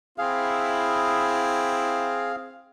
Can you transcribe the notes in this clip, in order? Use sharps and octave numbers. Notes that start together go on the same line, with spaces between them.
C4 E4 G#4 F5